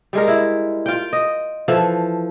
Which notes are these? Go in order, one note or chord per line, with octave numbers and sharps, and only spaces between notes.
G3 G#3 A#4
E4
F4 G5
D#5
E3 F3 A4